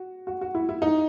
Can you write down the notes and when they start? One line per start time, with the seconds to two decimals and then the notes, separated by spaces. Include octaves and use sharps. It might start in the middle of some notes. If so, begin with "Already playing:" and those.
Already playing: F#4
0.27 F#4
0.41 F#4
0.55 E4
0.69 E4
0.82 D#4